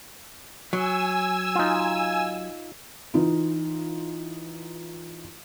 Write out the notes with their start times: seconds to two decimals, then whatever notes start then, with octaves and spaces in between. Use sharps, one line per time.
0.73 F#3 G#5 E6
1.55 D#4 F4
3.14 E3 D#4 F4